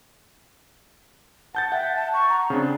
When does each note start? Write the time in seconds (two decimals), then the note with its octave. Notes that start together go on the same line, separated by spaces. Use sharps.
1.55 F#5 A5 G6 A6
1.72 E5 F#5 G5
1.96 A5
2.14 C#6
2.29 A#5
2.50 C#3 C4 D4 G#4